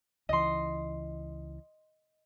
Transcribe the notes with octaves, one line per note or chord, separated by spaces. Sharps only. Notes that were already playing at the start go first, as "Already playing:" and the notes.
C#2 E3 D#5 C6